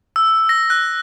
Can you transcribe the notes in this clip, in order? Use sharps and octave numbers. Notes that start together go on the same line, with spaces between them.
E6
A#6
F#6